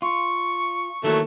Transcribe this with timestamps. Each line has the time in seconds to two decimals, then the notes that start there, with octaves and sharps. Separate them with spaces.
0.02 F4 C#6
1.04 D#3 E3 F#3 A3 A#3